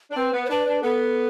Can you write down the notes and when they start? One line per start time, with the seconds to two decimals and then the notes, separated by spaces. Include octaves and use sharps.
0.10 D4
0.16 C4 B4
0.33 B3
0.45 C5
0.50 D4 B4
0.66 D4
0.83 B3 A4